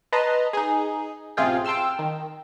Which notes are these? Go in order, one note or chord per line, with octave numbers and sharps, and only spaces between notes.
B4 D#5 A5 A#5 C6 D#6
D#4 G#4
A1 C3 F4 G#4 G5
G5 A5 C6 E6 F6
D#3